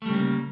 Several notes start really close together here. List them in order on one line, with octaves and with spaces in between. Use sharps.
A3 G3 C#3 A#3